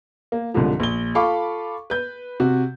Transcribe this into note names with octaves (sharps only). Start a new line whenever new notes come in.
A#3
C2 G#2 D3 F3
A#1 G7
F4 A4 F5 B5 C#6 D6
B4 G6
C3 F#4